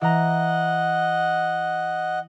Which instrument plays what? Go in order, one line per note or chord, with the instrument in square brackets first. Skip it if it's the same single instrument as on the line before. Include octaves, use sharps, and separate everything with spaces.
[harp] E3 A#5 [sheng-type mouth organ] D#5 F#5